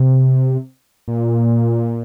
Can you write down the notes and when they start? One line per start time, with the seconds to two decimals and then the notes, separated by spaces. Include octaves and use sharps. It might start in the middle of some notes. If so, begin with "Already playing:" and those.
Already playing: C3
1.08 A#2